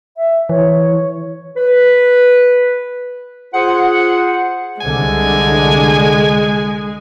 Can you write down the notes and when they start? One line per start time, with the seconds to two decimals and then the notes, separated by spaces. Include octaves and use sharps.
0.17 E5
0.49 E3 C#5
1.56 B4
3.53 F4 G#4 C5 F#5
4.81 C2 D3 G#3 G#5